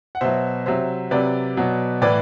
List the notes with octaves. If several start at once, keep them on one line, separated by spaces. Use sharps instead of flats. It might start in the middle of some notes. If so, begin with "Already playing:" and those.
F#5
B2 F#3 C5 E5
C3 F#3 C5 E5
C3 F#3 B4 D5
B2 F#3
A2 E3 B4 D5